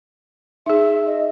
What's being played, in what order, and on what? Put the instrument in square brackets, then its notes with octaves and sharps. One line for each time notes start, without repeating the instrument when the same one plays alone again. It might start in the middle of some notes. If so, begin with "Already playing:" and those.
[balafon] D#4 G#4 [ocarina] E5
[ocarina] D#5